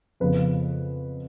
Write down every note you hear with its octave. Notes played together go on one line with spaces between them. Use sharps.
F2 C#3 F3 B3 B4